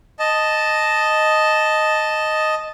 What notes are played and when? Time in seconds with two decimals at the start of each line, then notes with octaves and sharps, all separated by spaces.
0.19 D#5 A5